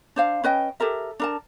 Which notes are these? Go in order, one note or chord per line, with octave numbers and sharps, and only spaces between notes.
D4 C5 F5
C#4 B4 D#5 G5
G4 A4 A#4 E5
D4 A#4 A5